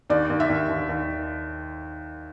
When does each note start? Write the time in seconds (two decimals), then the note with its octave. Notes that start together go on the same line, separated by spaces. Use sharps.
0.10 D#2 D5
0.29 D#2
0.40 E5
0.50 D#2
0.69 D#2
0.89 D#2